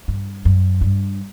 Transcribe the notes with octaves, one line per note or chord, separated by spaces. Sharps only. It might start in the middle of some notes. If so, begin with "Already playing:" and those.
G2
F#2
G2